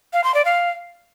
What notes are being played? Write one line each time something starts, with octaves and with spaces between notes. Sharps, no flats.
F5
C6
D5
F5